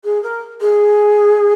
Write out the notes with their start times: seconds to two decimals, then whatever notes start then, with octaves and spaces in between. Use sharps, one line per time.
0.04 G#4
0.22 A#4
0.60 G#4